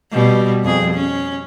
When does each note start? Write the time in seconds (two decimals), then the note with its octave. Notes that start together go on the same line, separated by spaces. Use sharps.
0.12 B2 G3
0.64 F2 G#4
0.94 C#4